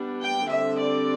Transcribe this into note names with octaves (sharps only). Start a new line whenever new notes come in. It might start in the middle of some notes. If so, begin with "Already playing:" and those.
Already playing: G3 B3 D4
G5
D3 G3 C4 E5
D5